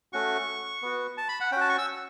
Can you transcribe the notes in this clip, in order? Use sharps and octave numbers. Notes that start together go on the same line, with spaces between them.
A3 C#4 F#4 C#6
B3 F#4
A5
B5
F#5
C#4 F#4 G5 A5
C#6
E6